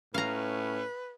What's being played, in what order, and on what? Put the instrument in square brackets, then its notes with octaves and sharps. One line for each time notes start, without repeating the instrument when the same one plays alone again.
[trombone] A2 [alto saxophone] C#4 [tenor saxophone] B4 [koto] F5 A#5